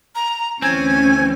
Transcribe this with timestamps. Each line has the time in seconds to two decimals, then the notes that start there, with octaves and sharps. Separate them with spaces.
0.15 A#5
0.62 D2 E3 C4 C#4 G#5